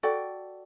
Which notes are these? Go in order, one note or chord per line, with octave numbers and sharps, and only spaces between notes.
F#4 A4 D5 G5